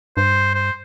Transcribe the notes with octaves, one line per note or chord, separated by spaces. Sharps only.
G2 C5
C5